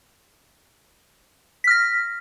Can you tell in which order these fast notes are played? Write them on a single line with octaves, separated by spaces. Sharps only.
B6 F6 A#6